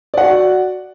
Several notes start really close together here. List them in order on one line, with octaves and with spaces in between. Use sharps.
D5 F#5 F#4